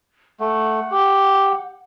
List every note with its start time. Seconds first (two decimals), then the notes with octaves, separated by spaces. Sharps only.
0.40 A3 F#5
0.91 G4